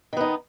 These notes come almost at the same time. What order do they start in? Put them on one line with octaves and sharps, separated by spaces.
D#3 B3 D#4